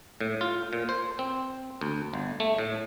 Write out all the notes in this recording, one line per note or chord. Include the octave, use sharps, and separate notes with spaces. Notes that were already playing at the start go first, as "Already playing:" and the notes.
A2
F4
A#2
C5
C4
D2
G1
A3
A2